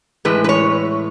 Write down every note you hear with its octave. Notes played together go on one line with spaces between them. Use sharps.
A2 E3 G#3 B4
B4
C#5